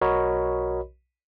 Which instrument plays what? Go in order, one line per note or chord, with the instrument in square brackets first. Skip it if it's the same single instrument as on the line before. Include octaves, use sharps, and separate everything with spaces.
[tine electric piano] B1 F#4 A#4 C#5 D#5 B5